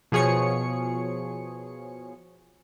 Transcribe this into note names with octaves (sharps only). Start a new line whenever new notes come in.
B2 F3 G#4 C#5 C#7